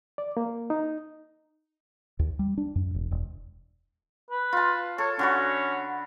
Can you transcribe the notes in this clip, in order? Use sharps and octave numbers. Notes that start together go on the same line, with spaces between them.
D5
A#3
D#4
D#2
G3
D4
F#2
E1
E1
B4
F4 A5
A4 C#5
D3 C#4 F#4 B5